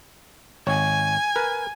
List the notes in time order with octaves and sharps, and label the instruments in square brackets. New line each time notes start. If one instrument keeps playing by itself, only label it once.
[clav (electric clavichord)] G#1 C#5 [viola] G#5
[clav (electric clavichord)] A#4 B4